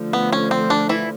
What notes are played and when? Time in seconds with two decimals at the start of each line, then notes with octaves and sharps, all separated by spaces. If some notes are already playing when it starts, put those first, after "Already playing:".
Already playing: D3 F3 A3
0.13 B3
0.32 C#4
0.51 C4
0.70 D4
0.89 E3 E4